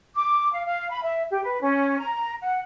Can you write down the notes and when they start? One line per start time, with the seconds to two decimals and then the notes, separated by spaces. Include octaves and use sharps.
0.15 D6
0.52 F5
0.66 F5
0.91 B5
1.03 E5
1.31 G4
1.44 B4
1.61 C#4
2.00 A#5
2.41 F#5